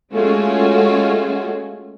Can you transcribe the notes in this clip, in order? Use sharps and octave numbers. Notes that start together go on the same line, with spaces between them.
G#3 A3 C#4 F4 F#4